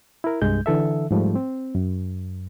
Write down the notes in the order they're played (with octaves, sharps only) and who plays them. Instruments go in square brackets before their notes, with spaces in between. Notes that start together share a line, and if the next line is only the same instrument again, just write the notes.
[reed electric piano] E4 A#4
C2 G2 G#3 G6
D3 E3 A4 E5
G#2 F3 G3 A3
C4
F#2